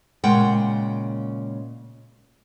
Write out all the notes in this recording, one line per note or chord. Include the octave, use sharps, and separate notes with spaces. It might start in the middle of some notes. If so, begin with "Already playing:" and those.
A#2 C#3 G#3 F#5 G5